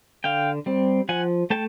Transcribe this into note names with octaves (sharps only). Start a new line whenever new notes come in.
D3 F5 G5
G3 C4
F3 F#5 G#5
A3 G5 A5